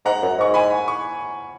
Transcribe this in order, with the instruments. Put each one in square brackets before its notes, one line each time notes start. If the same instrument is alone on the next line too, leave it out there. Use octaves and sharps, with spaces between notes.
[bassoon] G#2 [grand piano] F#5 A#5
[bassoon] F#2
[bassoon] G#2 [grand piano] C#6
[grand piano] G#5 B5
C#6